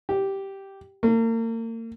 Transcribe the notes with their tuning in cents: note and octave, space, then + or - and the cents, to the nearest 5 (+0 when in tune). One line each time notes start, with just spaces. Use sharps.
G4 -5
A#3 -40